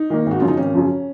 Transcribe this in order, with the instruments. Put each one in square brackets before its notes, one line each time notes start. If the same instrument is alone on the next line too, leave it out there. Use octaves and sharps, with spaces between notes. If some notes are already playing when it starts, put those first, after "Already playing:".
Already playing: [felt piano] D#4
[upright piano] D#3 A#3
[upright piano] G#1 [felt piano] F#4
[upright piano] F#2 C#3 F3 [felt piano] F4
[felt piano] D#4
[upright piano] G#1 [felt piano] C#4
[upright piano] F#2 C#3 F3